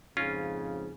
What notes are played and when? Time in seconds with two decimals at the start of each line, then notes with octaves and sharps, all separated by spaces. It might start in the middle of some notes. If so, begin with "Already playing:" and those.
0.17 F2 G#2 C#3 C#4 F4